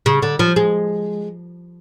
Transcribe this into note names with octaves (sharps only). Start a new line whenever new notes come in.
C#3
D3
F3
G#3